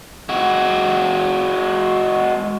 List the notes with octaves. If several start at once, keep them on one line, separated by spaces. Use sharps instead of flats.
G#3 F#4